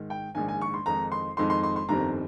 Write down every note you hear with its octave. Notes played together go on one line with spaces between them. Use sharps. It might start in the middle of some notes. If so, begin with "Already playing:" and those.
Already playing: G#2 D#3
G5
A#1 G#2 D#3 G#5
G#5
C#6
C6
F2 D#3 G#3 D#4 A#5
C6
F2 D#3 G#3 D#4 C6
C6
C6
C6
G1 F2 D#3 G3 C4 A#5